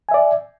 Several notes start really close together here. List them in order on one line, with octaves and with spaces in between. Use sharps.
G#5 E5 D5